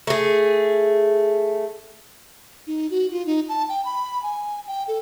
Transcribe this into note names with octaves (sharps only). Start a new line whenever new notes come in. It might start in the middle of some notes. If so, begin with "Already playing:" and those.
A3 G#4
D#4
F#4
F4
D#4
A5
G5
B5
G#5
G5
A4